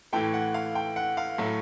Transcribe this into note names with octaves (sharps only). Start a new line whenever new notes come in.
A2 E3 A3 G5
F#5
F5
G5
F#5
F5
A2 F#3 A3